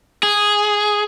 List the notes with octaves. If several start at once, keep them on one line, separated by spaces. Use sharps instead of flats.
G#4